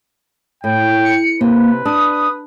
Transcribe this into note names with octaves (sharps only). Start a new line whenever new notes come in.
A2 G5
C#7
C3 A#3 B4
D4 D#6